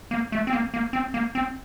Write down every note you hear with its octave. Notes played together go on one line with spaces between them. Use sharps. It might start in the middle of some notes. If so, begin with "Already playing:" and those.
A#3
A3
C4
A#3
A#3
C4
A#3
C4